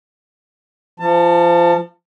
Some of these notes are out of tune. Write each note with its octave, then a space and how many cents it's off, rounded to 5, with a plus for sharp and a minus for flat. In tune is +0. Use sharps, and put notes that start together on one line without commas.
F3 -25 A5 +30